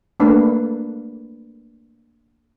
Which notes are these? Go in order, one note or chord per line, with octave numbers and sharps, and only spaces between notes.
A3 A#3 D4 B4